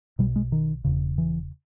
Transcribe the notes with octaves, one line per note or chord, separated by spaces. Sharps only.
B1 B2 G3
G#3
D#3
E1 E2 C#3
E3